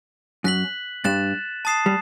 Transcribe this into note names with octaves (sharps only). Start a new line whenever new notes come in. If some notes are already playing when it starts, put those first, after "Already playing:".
F#2 F#6 B6 F#7
G2 F#6 A6 E7
A5 D#6 A6 C7 E7
G3